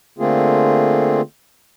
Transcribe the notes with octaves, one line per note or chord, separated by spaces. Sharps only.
D3 A3 A#3 C4 F4 G#4